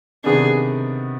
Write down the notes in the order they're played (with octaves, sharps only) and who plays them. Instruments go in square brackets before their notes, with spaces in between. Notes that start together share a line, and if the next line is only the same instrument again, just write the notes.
[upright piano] C3 D#3 B3 D4 [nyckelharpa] G#4